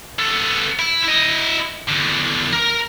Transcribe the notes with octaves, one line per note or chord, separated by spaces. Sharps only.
B3 A4
E4
E4 D#5
E2 D3
A#4 A#5